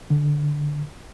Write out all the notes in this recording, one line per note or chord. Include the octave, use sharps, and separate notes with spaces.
D3